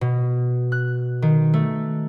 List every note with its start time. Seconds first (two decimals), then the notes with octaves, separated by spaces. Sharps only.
0.01 B2
0.72 F#6
1.22 D#3
1.54 A3